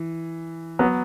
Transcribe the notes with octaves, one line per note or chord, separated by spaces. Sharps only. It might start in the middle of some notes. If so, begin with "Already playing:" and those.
Already playing: E3
F#3 B3